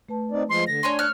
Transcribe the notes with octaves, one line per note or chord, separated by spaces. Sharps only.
A3 B4 A5
C4 D#4 D5
F3 G#3 C6
D3 A#6
D4 C#5 G#5 C6
C#5 F6 F#6